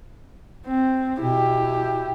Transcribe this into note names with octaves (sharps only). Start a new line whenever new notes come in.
C4
B2 E4 G4